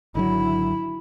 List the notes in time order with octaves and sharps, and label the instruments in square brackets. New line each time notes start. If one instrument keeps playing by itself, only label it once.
[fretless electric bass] G#1 D3 F#3 [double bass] E4